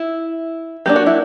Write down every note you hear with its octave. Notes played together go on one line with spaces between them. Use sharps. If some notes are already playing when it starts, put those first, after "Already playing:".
Already playing: E4
F#3 A#3 D4 G4
F#4
E4